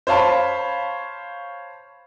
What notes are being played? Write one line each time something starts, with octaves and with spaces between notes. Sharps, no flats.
C5 C#5 F5 A5 B5